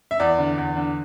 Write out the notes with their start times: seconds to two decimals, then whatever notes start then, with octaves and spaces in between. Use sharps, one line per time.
0.11 E5
0.20 E2 D5
0.39 D3
0.58 E2
0.77 D3